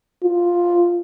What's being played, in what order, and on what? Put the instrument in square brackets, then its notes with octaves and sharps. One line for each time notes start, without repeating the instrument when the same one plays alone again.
[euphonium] F4